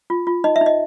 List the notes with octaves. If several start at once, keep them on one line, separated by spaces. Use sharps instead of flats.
F4
F4
D#4 D#5
E5
D#4
D#5